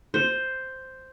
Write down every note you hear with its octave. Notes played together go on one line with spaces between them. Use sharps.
C5